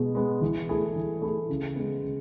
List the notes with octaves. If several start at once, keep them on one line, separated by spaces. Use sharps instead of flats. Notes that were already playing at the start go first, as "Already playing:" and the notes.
Already playing: B2 G#3 B3
G#3 B3
E3
A3 E4 G#4
E3
A3 E4 G#4
C#3
G#3 B3
C#3